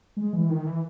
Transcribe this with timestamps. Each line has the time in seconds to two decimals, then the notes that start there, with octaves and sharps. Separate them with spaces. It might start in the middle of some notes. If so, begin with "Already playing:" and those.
0.17 G#3
0.33 E3
0.49 D#3
0.66 E3